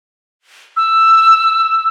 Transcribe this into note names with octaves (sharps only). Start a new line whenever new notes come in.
E6